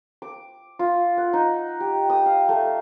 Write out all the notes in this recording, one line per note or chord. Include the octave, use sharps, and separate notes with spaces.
D6
F4
F#5
D#4
G4
D#6
F5
A3